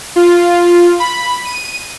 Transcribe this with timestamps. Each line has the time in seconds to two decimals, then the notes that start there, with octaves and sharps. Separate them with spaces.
0.16 F4
1.00 B5
1.45 D#7